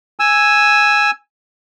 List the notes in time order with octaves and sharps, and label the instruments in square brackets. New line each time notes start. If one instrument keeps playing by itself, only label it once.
[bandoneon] G#5 E6